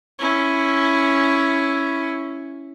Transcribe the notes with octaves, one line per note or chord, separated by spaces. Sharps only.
C#4 E4